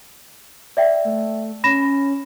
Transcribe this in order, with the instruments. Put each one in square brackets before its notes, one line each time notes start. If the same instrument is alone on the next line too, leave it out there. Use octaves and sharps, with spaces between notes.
[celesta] D5 E5 G5
[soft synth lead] A3
[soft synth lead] C#4 [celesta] B5 A#6 E7